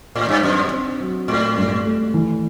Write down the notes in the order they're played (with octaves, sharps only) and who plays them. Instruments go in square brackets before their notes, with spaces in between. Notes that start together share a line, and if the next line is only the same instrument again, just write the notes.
[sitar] A2
G2
[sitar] F#2 [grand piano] C4
[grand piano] C4
F#3
[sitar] A2 [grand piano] A3
[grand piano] G2
A3
E3